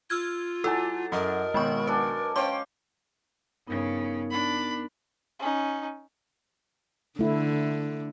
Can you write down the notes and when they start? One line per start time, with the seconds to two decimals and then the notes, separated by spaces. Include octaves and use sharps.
0.10 F4 E6 F6 G#6
0.64 F#3 E4 A4 G#5 A5 E6
1.12 F#2 A#4 D#5
1.54 G#1 B2 G#3 G5 B5 C#6
1.87 F#3 D4 B4 G#5
2.36 C#4 C5 C#5 F5 G5 D6
3.67 G2 C#3 B3 D#4 A#4
4.31 D4 B5
5.40 C#4 D#4
7.19 D3 A3 E4